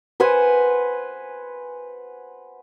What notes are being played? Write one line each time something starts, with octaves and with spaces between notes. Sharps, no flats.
B4 C5 F#5 G#5